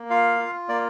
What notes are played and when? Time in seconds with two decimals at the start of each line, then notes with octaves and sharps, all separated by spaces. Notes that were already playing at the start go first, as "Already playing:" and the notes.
Already playing: A#3
0.10 F4 F5
0.39 F4
0.69 A#3 D5